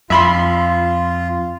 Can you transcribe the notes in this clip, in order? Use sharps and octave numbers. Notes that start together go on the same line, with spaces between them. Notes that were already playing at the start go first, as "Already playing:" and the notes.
F2 F4 E5 B5 C6